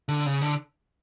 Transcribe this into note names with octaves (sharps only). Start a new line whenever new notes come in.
D3
C#3
D3